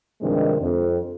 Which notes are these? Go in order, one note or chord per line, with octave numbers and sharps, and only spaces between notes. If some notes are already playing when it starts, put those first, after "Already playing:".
G2 C3 D#3 F3 G#3 D4
F2